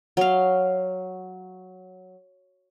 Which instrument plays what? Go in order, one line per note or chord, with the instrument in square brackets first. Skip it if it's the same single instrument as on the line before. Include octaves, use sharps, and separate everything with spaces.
[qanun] F#3 F5